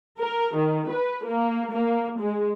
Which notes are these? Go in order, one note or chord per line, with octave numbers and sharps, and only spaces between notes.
A#4
D#3
B4
A#3
A#3
G#3